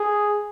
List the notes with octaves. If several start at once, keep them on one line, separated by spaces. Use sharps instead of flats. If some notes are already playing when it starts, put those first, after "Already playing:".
Already playing: G#4